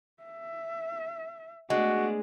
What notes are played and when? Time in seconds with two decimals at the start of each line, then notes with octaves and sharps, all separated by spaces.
0.23 E5
1.70 G#3 A3 B3 D4 F#4